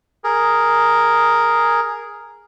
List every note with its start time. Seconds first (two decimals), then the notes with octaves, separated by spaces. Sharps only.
0.24 G#4 A#4